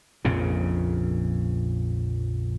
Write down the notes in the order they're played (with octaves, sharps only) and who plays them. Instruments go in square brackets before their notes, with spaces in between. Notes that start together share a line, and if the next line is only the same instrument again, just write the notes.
[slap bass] A#1 F2 A#2 C#3